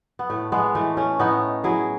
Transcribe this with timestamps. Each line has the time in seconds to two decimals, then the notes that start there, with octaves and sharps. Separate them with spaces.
0.19 B3
0.30 A2 A3
0.52 G#3 B3
0.75 E3 A3
0.97 A3 C#4
1.19 A2 B3 D#4
1.64 F#3 E4 G#4